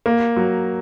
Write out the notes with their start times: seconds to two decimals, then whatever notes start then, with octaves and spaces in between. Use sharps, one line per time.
0.06 A#3
0.36 F#3